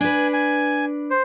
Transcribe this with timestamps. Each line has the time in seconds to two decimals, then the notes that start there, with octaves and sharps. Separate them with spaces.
0.01 D4 B4 G#5
0.33 G#5
1.10 C5